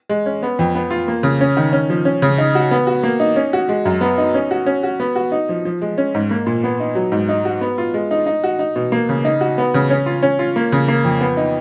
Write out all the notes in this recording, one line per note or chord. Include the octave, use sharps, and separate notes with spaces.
G#3
C#4
B3
F2
B3
F4
A#3
C#3
C#4
D#3
C#4
F3
C#4
C#3
D#4
F#4
B3
F#4
A#3
D#4
C#4
F#4
G#3
F#2
B3
D#4
C#4
F#4
C#4
F#4
B3
F#4
D#4
F3
F3
G#3
C#4
G#2
A#3
A#2
B3
D#4
F#3
G#2
D#4
F#4
B3
F4
G#3
D#4
D#4
F#4
D#4
B2
A#3
C#3
D#4
F#4
B3
C#3
C#4
F4
C#4
F4
A#3
C#3
A#3
F2
B3
D#4